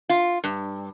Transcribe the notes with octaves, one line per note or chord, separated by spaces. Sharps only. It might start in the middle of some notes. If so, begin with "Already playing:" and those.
F4
G2